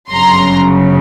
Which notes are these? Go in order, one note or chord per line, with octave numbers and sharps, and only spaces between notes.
G1 F#2 C#3 F#3 A#5 C6